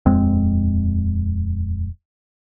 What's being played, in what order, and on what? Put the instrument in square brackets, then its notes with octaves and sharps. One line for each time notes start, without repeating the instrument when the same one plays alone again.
[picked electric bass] D#1 F2 G#3 C4